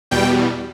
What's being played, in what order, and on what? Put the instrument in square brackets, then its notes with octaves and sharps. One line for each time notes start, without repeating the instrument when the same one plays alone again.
[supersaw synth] E2 B2 G3 G5